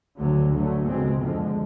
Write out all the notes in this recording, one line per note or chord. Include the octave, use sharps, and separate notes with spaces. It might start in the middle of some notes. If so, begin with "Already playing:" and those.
D2 D3 F#3
D2 D3 F#3 A3
C#2 B2 G#3 C4
F2 D3 F3 G#3